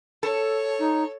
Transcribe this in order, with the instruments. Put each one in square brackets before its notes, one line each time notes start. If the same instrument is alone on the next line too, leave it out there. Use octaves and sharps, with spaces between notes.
[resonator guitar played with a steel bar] A4 [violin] C#5
[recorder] D#4